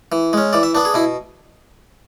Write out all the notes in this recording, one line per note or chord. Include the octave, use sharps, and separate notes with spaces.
E3
G#3 C#4
E3 D5
E5
B3 D4
G#4
B2 E4